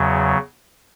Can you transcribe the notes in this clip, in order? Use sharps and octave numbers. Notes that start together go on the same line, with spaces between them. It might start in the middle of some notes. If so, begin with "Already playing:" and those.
Already playing: E2 C#3 F#3